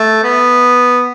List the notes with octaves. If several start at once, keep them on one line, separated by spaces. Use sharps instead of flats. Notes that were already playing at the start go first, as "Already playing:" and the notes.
Already playing: A3
B3